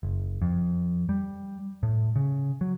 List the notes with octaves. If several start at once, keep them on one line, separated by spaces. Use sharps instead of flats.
F#1
F2
G3
A2
C#3
F#3